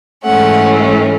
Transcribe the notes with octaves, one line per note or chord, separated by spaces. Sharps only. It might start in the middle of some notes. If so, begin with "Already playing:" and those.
G#2 E3 A3 C#4 F#5